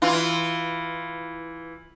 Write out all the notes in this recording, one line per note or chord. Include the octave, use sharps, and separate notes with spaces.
E3 F4